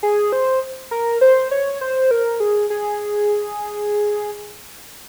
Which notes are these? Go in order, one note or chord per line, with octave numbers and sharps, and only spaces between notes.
G#4
C5
A#4
C5
C#5
C5
A#4
G#4
G#4